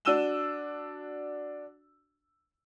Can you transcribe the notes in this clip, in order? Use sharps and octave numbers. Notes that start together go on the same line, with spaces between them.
D4 F#4 E6 D#7 E7 G7